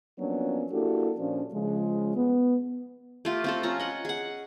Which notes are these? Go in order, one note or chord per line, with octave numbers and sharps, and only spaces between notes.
F3 F#3 A#3 B3 C#4 D4
A#3 D4 E4 F#4 G4 A4
A#2 F3 C#4 D4
C#3 F3 G#3
B3
A3 F4 G4
C4 F4 A4
F3 C#4 A#5
D#5 F#5
G#4 F#5